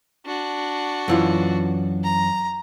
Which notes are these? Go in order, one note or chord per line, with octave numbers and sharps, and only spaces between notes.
D4 F#4
F#2 E3 F4
A#5